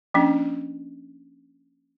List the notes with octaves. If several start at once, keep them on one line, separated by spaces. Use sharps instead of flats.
F3 A#3 C#4 D4